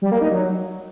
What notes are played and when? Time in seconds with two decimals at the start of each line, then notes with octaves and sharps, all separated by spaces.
0.02 G3
0.11 A#3
0.21 D#4
0.31 F#3